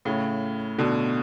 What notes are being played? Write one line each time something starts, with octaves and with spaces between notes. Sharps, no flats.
A2 C#3
B2 D3